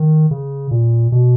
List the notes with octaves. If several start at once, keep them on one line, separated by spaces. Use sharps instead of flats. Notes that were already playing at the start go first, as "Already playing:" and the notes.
Already playing: D#3
C#3
A#2
B2